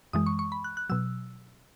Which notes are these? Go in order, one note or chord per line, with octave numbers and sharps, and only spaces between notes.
F#2 E3 G#3 D#6
C#6
C#6
B5
F#6
F#6
B2 F#3 E6